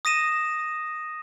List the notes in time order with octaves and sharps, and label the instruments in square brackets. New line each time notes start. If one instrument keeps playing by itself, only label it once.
[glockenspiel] D#6 A#6 D#7 E7